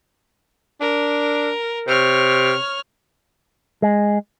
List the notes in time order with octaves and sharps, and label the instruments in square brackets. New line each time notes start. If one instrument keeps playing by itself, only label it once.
[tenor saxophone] D4 [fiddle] A#4
[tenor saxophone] C3 [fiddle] C#5 F6
[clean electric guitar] G#3